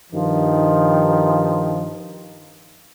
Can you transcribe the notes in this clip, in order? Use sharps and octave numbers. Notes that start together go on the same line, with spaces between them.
G2 D#3 F3